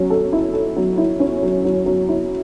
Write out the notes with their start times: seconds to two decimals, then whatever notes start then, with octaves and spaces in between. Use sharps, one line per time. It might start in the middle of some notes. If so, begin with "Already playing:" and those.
Already playing: F#3 C#4
0.10 A4
0.33 E4
0.53 A4
0.76 F#3
0.98 E4
1.20 C#4
1.43 F#3
1.65 F#3
1.86 F#3
2.09 E4